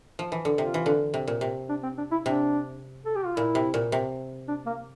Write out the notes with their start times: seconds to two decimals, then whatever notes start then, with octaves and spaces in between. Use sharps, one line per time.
0.19 F3
0.32 E3
0.45 D3
0.58 C3 F4
0.74 E3
0.86 D3
1.14 C3
1.27 A#2
1.41 C3
1.69 D4
1.83 C4
1.98 D4
2.12 E4
2.25 C3 D4
3.06 A4
3.16 G4
3.26 F4
3.37 A#2 E4
3.55 C3
3.74 A#2
3.92 C3
4.48 D4
4.66 A#3